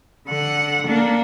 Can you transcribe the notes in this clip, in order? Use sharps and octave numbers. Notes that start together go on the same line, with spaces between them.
D3 F#5
A#3 D4